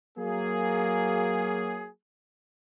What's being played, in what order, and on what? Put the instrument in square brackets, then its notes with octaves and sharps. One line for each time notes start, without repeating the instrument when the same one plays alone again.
[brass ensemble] F#3 A#3 G#4